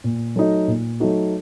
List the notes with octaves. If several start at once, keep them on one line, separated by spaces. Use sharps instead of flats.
A#2
F#3 A3 D#4 F#4
A#2
F#3 A3 D#4 F#4